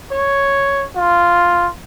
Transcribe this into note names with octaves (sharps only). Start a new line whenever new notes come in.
C#5
F4